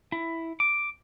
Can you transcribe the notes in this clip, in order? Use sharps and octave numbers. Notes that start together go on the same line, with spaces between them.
E4
D6